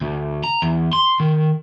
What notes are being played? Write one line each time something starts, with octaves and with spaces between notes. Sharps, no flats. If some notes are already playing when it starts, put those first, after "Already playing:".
D2
A#5
E2
C6
D#3